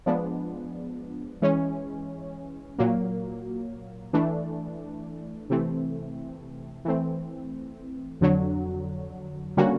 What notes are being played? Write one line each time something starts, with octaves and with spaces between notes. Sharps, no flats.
F3 G#3 B3 D4
E3 G#3 C#4
A#2 F#3 A#3
E3 A3 D4
C3 E3 A3 C4
E3 A3 C4
F2 D3 F#3
D3 G3 A#3 C#4 F#4